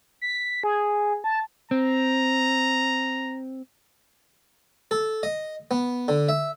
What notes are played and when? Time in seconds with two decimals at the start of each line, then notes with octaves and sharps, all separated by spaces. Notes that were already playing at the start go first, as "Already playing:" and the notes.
0.22 B6
0.63 G#4
1.24 A5
1.71 C4 A#5
4.91 A4
5.23 D#5
5.71 B3
6.08 D3
6.29 E5